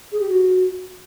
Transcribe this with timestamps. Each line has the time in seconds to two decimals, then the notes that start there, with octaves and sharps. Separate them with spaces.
0.12 G#4
0.20 G4
0.29 F#4